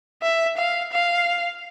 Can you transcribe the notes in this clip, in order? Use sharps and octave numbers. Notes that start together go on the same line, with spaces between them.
E5
F5
F5